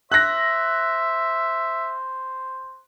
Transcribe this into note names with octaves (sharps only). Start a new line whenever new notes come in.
C5 E5 F#6 A#6